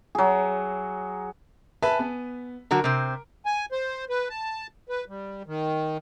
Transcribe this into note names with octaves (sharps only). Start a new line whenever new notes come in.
F#3 G#4
B4 E5 G#5 A5
B3
D3 F#3 F#4 A#4
C3 C4
G#5
C5
B4
A5
B4
G3
D#3